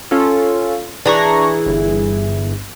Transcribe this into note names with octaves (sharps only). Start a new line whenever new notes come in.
C#4 F4 A4
E3 D4 G#4 A#5 C#6
G1